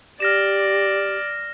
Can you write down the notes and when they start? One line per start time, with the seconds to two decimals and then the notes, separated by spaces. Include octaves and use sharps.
0.20 G4 D5 F6 A#6 E7